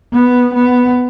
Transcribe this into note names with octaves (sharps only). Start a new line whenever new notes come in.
B3
B3